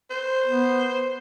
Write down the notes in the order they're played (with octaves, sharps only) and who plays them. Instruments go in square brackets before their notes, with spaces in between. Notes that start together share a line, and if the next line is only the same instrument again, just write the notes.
[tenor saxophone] C5
[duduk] B3